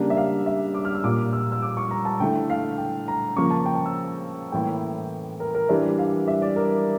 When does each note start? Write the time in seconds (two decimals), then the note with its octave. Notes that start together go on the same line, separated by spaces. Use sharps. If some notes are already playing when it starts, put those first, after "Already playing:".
Already playing: C#3 G3 A#3 D4
0.10 E5
0.17 F5
0.46 E5
0.74 D6
0.85 F6
0.95 E6
1.04 A#2 G3 A#3 D6
1.33 E6
1.52 E6
1.62 D6
1.77 C#6
1.91 A#5
2.05 A5
2.20 D3 A3 E4 G5
2.50 F5
2.78 G5
3.08 A#5
3.36 C#3 F3 A#3 C#6
3.51 A5
3.66 G5
3.75 A5
3.85 E6
4.52 A2 E3 A#3 E4 G5
5.40 A#4
5.55 A#4
5.69 E3 G3 D4 E5
5.99 F5
6.28 E5
6.42 D5
6.56 A#4